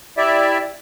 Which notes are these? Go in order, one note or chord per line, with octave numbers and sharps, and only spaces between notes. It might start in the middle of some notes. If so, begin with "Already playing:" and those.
E4 G4 D5 E5